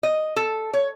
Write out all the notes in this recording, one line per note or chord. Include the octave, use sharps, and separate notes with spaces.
D#5
A4
C#5